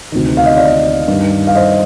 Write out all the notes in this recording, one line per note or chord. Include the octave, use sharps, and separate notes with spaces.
D2 C3 D#3
F5
D#5
D5 F5
G2 D#3
F5
C5 D#5